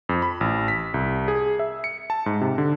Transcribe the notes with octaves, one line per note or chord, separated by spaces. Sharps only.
F2
B5
A1
B6
C2
G#4
E5
C#7
A5
G#2
C3
D3